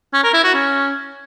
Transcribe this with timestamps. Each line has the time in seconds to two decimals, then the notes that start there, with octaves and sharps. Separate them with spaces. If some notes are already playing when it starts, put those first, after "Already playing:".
0.13 C#4
0.23 A#4
0.34 E4
0.44 F#4
0.54 C#4